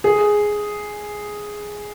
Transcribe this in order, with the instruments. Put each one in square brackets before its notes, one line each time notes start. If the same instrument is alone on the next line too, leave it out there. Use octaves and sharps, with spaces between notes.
[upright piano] G#4